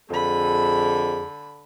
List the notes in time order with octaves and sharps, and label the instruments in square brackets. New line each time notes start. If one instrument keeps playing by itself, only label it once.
[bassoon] F2 [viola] D3 B5 [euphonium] G#4